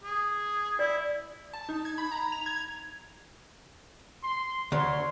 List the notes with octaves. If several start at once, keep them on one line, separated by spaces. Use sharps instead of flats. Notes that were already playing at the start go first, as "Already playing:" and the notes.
G#4
E4 D5
A5
D#4
G#6
B5
A#5
F7
G#6
C6
D2 C#5 C6